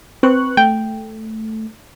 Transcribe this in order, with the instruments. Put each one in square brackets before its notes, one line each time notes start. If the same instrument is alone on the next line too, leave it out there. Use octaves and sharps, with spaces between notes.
[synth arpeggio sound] C4 [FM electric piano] B4 C#6 F#6
[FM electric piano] A3 [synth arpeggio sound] G5